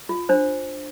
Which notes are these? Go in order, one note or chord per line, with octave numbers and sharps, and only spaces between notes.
F4
D4 C5